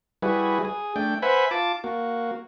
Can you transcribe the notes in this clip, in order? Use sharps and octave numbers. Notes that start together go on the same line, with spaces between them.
G3 E4 F#4 G#4 B4
G#4
A3 D4 G5
B4 C5 E5 F#5 G#5 B5
F4 A5 D6
A#3 F#4